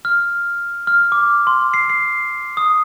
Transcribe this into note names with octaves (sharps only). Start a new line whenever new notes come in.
F6
F6
D6
C6
C7
C7
D#6